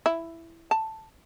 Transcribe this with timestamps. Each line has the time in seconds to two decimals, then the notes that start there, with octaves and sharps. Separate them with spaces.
0.06 E4
0.71 A5